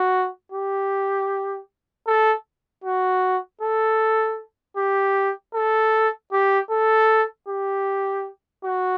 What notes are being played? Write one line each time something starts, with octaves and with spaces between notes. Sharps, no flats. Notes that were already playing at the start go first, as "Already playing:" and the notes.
Already playing: F#4
G4
A4
F#4
A4
G4
A4
G4
A4
G4
F#4